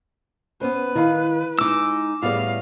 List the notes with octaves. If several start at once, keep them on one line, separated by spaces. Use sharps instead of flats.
B3 C#4 B4 C5
D#3 E4 F5 B5
G#3 D#4 D6 E6
A2 G3 B3 F4 G#4 F5